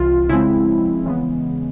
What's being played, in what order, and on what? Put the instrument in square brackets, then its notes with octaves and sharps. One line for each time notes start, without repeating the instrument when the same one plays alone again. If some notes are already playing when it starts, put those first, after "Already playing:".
Already playing: [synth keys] C2 C3 E3 F4
C#3 F3 G#3 C4 E4
C#3 E3 G#3 B3